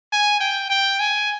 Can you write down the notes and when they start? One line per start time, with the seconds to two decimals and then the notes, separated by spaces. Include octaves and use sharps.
0.13 G#5
0.41 G5
0.70 G5
1.00 G#5